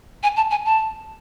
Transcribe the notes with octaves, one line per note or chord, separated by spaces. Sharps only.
G#5
A5
G#5
A5